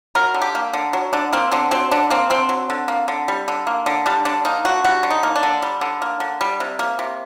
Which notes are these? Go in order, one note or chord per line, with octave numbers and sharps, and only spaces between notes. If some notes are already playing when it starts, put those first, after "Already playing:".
F#3 A#4
D3
G4
A#3
D3
F#3
D3 D4
A#3 C4
D3 C4
F#3 C4
D3 D4
A#3 C4
D3 C4
F#3
D3
A#3
D3
G3
D3
A#3
D3
G3 D4
D3 D4
A#3 D#4
D3 F#4
G3 F#4
D3
D#4
A#3
D4
D3
G3
D3
A#3
D3
G3
C3
A#3
C3